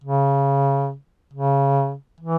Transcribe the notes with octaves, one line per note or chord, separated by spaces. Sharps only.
C#3
C#3
E3